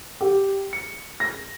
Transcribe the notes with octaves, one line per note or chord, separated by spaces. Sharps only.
G4
C#7
A#6